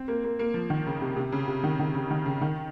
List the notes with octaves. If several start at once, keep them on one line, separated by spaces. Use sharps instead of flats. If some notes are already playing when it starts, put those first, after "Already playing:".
Already playing: C4
A#3
A#3
A#3
F3
D#3
C#3
C3
C3
C#3
C3
D#3
D#3
C#3
D#3
C#3
D#3